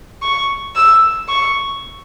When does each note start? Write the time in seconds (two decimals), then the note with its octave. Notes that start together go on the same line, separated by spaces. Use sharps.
0.22 C#6
0.76 E6
1.29 C#6